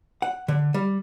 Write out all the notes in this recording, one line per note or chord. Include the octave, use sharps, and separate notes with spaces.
F#5
D3
G3